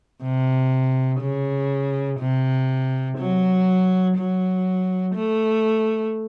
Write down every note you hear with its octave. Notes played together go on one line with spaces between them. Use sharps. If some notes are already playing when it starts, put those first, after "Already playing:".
C3
C#3
C3
F#3
F#3
A3